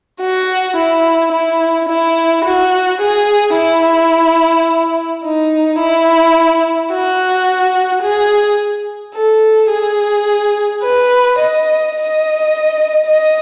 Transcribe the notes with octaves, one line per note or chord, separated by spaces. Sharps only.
F#4
E4
E4
E4
F#4
G#4
E4
D#4
E4
F#4
G#4
A4
G#4
B4
D#5
D#5
D#5